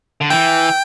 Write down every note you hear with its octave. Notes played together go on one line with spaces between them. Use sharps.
D3
E3 G5